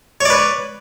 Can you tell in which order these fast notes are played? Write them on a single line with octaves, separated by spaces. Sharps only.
C#5 D5 B4